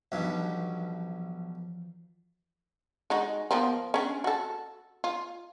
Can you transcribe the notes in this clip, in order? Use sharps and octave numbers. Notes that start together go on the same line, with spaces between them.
B1 G2 B2 E3 F3
G#3 D#4 F#4
F3 A#3 B3
C#4 D4
F#4 A4
F4